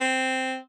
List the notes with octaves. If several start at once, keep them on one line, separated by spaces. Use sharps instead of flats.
C4